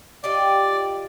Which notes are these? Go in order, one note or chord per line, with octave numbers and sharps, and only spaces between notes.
F4 G4 D5 D#5